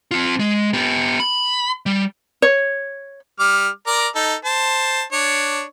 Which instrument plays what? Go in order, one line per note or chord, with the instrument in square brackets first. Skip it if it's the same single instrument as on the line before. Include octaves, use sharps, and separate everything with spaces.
[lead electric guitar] C4 F4
G#3
B3 G4
B5
G3
[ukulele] C#5
[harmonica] G3 D6 F6
A#4 D5 A#5
D#4 A4
C5 A5
D4 C#5